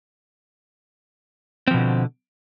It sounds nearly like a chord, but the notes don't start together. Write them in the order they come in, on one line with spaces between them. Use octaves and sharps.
C4 F3 B2 D3